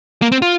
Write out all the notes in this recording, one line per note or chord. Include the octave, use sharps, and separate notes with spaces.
A#3
C4
F4